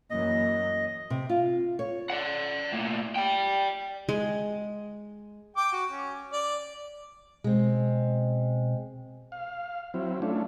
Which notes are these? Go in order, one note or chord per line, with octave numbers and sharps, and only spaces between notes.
F#2 E3 F#3 A#3 D#5
C3
F4
C#5
D5 F#5
A2 A#3
D5 G5
G#3
G5 D6
F#4
C#4
D5
B2 G#3 C4
F5
F#3 C4 E4
A3 C#4 D4 E4 F4